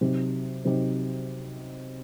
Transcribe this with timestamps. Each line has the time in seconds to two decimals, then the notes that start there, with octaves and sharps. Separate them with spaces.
0.01 C3 F#3 C4 D#4 G4
0.65 C3 F#3 C4 D#4 G4